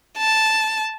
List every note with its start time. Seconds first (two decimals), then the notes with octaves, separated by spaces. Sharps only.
0.18 A5